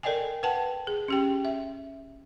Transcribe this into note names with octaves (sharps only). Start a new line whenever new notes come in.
A4 A#4 D5 D#5 G5 G#5
B4 F#5 G5 A5
G#4
C#4 G4 G5
E5